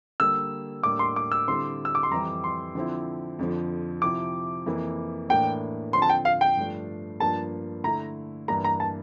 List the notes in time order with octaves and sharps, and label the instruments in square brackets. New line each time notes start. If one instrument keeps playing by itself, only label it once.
[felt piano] D3 G3 A#3 [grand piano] E6
[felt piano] A2 G3 A#3 D4 [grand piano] D6
[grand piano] C6
D6
E6
[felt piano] D3 G3 C4 E4 [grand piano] C6
[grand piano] E6
D6
C6
[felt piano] F2 E3 G3 [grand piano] A#5
[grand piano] C6
[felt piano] D3 F3 C4 E4
F2 D3 F3
[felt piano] C3 F3 C4 E4 [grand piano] D6
[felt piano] F2 E3 A#3 E4
[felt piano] A2 E3 A#3 D4 [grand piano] G5
[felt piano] D3 F3 C4 [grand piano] C6
[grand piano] A5
G5
F5
G5
[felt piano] G2 F3 A3 D4
[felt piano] G2 F3 A#3 D4 [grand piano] A5
[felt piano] D3 A3 E4 [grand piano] A#5
[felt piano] G2 E3 A#3 D4 [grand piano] A#5
[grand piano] A#5
A5